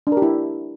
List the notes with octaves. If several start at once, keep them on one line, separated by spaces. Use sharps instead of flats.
D4
A#4
G4
E4